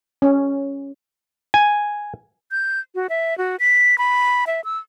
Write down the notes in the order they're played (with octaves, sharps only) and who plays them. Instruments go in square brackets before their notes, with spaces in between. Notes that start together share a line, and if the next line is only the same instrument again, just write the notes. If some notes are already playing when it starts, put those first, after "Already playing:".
[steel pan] C#4
[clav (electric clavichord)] G#5
[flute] G6
F#4
E5
F#4
B6
B5
E5
E6